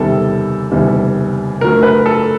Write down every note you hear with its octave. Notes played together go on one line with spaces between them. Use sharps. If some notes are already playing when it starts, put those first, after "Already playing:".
Already playing: F#1 E2 C3 D#3 G3 A4
F#1 E2 C3 D#3 G3
F#1 F#2 D3 F#3 A3 A#4
B4
A4